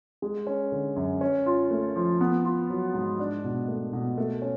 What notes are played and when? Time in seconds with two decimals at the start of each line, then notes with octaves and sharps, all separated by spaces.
0.22 G#3
0.47 C#4
0.72 D3
0.96 F#2
1.21 C#4
1.46 F4
1.71 A3
1.96 F3
2.21 B3
2.45 F4
2.70 F#3
2.94 G#2
3.20 D4
3.44 B2
3.68 A3
3.93 B2
4.18 A3
4.42 C#4